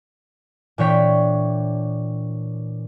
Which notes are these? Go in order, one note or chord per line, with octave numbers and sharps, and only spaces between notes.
A#2 E3 D4 C#5 G5 B6